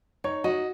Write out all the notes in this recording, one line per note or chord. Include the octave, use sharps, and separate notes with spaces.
D#4 C#5
F#4 D#5